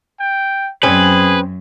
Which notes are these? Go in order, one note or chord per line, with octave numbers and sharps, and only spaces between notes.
G5
F#2 C4 C#4 G#4 B4